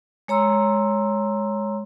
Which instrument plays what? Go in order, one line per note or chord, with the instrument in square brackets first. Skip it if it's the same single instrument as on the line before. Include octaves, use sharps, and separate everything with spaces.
[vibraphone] G#3 C#5 A#5 C6 E6